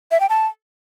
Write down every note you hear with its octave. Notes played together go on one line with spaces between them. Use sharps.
E5
G5
A5